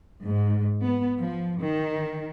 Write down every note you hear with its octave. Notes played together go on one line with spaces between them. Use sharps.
G#2
B3
F3
D#3